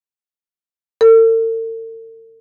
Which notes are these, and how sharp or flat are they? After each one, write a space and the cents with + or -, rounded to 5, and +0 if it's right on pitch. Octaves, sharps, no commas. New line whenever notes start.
A4 +45